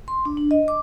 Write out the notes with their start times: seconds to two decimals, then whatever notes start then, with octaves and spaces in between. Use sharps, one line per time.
0.08 C6
0.25 D4
0.37 D4
0.51 D#5
0.68 D6